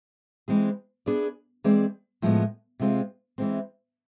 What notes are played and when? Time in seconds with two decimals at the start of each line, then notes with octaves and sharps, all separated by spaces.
0.48 E3 G#3 C4 G#4
1.06 B3 D4 G#4 D5
1.64 E3 G#3 C4 G#4 D5
2.22 A2 F3 G#3 B3
2.79 C3 G#3 C4 F4
3.38 E3 G#3 C4